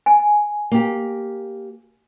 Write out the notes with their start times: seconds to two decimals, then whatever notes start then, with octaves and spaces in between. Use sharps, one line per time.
0.06 G#5
0.71 A#3 G4